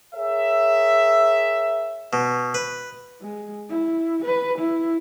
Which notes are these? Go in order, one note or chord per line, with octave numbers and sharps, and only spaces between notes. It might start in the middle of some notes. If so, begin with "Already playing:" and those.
G#4 A#4 C#5 E5
B2
B4
G#3
E4
B4
E4